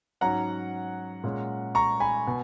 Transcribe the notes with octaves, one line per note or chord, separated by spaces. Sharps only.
G#2 F#3 C#4 F#5 A#5
A#2 G#3 C#4
A#5 C#6
G#5 B5
B2